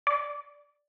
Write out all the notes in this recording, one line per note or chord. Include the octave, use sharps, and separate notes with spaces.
D5